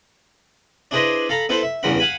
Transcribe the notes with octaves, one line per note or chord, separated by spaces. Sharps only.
D4 E4 G#4 B4 C5 D#5
A4 F5 A#5 B5
B3 E4 A4 B4 C5
E5
E2 G2 C#3 A#4 F#5 B5
F5 F#5 G#5 B5